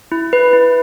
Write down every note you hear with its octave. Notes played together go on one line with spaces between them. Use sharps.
E4
B4
E4